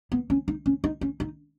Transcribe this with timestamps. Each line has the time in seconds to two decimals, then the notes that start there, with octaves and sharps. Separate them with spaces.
0.12 B3
0.30 C#4
0.48 D#4
0.66 C#4
0.84 D#4
1.01 C#4
1.20 D#4